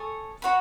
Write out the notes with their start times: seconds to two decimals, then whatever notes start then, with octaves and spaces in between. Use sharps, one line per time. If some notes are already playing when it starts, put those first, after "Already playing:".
Already playing: A4 C#5 G#5 D#6
0.42 F#4 C#5 F#5 B5